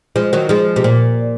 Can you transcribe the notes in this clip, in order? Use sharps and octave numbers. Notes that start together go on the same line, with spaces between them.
F3 G#3
D#3 F#3
F3 G#3
C3
A#2